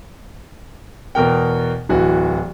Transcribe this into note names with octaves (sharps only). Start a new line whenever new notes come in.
E2 B2 A#4 G5
D1 E3 F#4